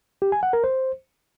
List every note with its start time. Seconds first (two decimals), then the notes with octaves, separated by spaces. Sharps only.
0.22 G4
0.32 G#5
0.43 F#5
0.53 A#4
0.64 C5